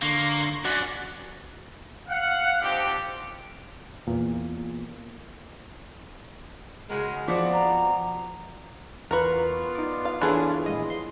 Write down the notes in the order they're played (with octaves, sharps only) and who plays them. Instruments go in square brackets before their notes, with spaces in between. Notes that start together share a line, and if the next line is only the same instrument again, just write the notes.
[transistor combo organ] D3 C6 C#6 [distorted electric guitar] A#3
[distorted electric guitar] F#2 [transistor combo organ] F#4 D5 F#5
[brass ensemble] F5 F#5
F3 G3 C4 D4 D#4 G4
[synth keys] E2 A#2
[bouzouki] C#3 F#4 A#4 [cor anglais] G#3
[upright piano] F3 [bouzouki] B3 C4 F#4 [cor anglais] D5
[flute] A#5
[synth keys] E2 C#6 [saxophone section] B3 F4 [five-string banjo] A#4 B4
[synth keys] D#4 D5
[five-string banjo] F5
[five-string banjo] E3 G#4 [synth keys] D4 A4 C#5
[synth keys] A#1 G#3 D#5
C6